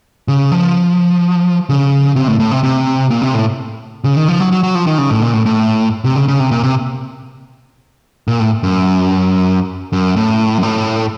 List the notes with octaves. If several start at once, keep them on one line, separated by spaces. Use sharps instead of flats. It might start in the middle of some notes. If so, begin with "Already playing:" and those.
C#3
F3
C#3
C3
A2
A2
C3
C3
A#2
C3
A2
C#3
D#3
F3
F#3
F#3
F#3
F3
D#3
C#3
A2
A#2
A2
A2
C3
C#3
C#3
C3
A#2
C3
A#2
A2
F#2
F#2
A2
F#2
A2